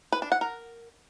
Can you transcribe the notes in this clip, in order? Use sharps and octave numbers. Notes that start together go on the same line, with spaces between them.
B4
D4
F#5
A#4